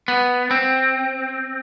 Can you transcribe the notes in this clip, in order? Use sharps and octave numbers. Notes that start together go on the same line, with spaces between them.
B3
C4